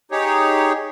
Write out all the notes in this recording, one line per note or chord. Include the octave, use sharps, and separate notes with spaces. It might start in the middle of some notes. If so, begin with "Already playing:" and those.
D#4 G4 G#4 C#5